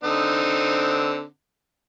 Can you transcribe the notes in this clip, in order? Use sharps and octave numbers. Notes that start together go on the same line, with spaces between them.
D3 C4 D#4